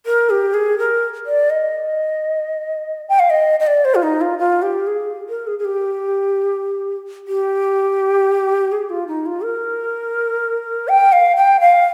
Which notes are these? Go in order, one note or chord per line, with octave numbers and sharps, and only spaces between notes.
A#4
G4
G#4
A#4
D5
D#5
G5
F5
D#5
D#5
D5
C5
F4
D#4
F4
F4
G4
G#4
A#4
G#4
G#4
G4
G4
G#4
F4
D#4
F4
A#4
G5
F5
G5
F5